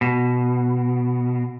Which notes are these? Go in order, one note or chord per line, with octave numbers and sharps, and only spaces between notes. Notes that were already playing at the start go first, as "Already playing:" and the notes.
B2